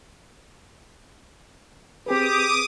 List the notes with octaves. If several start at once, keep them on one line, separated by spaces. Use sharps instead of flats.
C4 G4 G#4 B4 D6 D#6